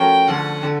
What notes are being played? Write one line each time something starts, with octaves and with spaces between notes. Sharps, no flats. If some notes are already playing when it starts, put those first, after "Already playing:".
Already playing: F3 A3 C#4 F#4 A#4 G5
D2 D3 F3 F#5
D3